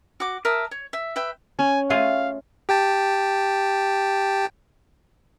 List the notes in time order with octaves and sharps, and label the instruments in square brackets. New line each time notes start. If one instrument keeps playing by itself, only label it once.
[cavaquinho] F#4 D6
A#4 E5 A5 D#6
C#5
E5
B4 E5 G5
[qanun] C#4 [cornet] G#5
[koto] A3 F4 G#4 [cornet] F5
[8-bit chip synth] G4 G5 A5